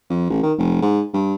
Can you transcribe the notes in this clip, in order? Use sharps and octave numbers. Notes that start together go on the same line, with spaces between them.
F2
A1
D#3
F1
G#2
G2